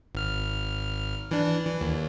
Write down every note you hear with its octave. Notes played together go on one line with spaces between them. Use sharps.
G#1 F6
E3 D4
E3
D#2